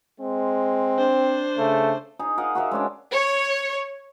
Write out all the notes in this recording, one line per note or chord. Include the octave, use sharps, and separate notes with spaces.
G#3 C4
D4 C5
C#3 A3
D#4 G#4 A#5
A#4 D#5 F5 F#5
F#4 A#4 E5 F5
G#3 C#4 D4
C#5